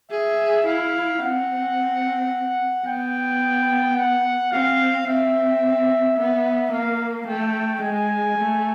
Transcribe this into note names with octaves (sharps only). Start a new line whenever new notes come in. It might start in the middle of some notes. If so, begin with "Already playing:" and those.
G#4 E5
E4 F5
C4 F#5
B3 G5
F#5
C4 F5
C4 E5
B3 E5
A#3 F5
A3 G5
G#3 G#5
A3